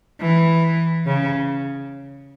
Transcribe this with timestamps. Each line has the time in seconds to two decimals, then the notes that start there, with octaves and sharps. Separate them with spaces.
0.21 E3
1.06 C#3